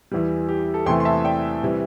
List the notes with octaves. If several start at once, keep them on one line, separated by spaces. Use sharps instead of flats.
E2 E3 G3
G4
A4
E2 C3 E3 A3 G5 C6
C6
E5 A5
D5 G5
C3 E3 G3